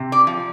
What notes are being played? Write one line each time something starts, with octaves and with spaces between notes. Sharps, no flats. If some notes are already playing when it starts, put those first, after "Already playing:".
Already playing: C3
D5
F3